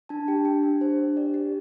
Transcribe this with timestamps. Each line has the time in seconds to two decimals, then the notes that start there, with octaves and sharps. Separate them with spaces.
0.09 D4 A5
0.28 G4 G5
0.45 D4 G5
0.63 D4
0.80 G4 C5
0.98 D4
1.17 G4 D5
1.34 G4